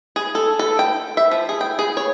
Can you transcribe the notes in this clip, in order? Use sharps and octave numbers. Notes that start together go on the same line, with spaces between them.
G#4
A4
A4
G5
E5
F3
G#4
G5
G#4
C#5